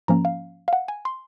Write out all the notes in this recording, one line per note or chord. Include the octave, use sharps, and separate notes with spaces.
G#2 F3 A#3 C#4 A#5
F5
F5
F#5
G#5
C6